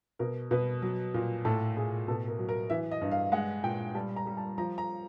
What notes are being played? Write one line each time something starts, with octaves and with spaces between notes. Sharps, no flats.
B2 A#4
B2 B4
F#3
A#2
A2 A4
A2 G#4
B2 A4
A#4
F#3
A#4
E3 E5
D#5
G2
F5
G#3 F#5
A#2 G5
G3 A5
A#5
G3
A5
F3 A#5
A#5